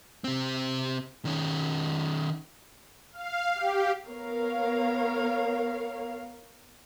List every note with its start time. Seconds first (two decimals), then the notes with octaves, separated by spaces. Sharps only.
0.24 C3 C4
1.25 D#3 C#4
3.13 F5
3.55 G4
4.09 B3 A#4 C#5 F5